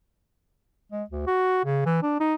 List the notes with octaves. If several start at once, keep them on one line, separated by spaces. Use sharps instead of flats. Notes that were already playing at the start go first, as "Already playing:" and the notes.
G#3
D2
F#4
C#3
E3
D4
D#4